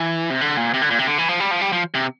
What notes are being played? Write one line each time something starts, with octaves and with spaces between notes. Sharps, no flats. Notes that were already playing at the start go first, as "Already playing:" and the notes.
Already playing: E3
C3
D3
A#2
C3
D3
A#2
C3
D3
E3
F3
G3
F3
G3
F3
C3